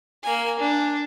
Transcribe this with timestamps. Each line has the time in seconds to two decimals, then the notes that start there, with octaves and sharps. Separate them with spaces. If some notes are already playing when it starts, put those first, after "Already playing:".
0.23 A#3 G#5
0.59 D4